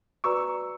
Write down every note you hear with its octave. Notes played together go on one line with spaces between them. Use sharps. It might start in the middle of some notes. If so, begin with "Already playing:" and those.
F#4 B4 D5 A#5 C#6 E6